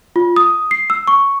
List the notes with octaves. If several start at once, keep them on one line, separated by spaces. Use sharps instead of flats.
F4
D#6
C7
E6
C#6